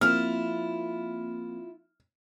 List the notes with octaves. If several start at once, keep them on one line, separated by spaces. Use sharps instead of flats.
F3 A#3 C4 E4 F4 F6